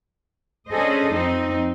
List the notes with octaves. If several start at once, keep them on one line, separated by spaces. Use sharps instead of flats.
C#4 D4 G#4 A4 C5 D#5
F2 C4 D#4